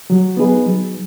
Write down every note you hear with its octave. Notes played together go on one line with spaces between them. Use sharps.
F#3
B3 D#4 G#4 B4
F#3